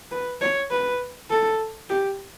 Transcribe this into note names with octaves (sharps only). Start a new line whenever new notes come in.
B4
C#5
B4
A4
G4